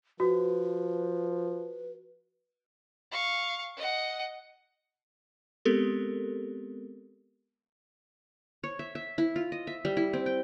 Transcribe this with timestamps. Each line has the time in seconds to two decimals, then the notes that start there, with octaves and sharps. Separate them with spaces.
0.20 F3 F#4 B4
3.11 F5 C#6
3.77 D#5 F#5
5.65 G#3 B3 C4 G4 A4 A#4
8.64 C#5
8.79 E5
8.95 E5
9.18 E4
9.36 F4
9.52 D#5
9.67 E5
9.85 G3
9.97 E4
10.13 C4
10.26 G5